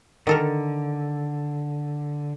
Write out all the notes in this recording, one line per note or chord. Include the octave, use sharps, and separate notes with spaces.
D3 D#3 A4 A#4